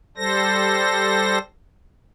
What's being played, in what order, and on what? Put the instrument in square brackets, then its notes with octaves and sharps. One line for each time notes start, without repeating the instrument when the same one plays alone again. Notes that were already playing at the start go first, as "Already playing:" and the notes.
[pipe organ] G3 A4 C5 A#6